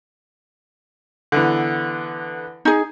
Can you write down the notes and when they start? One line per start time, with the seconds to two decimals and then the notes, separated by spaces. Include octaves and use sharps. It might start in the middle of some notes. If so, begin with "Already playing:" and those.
1.32 D3 E3 B3
2.65 D#4 G#4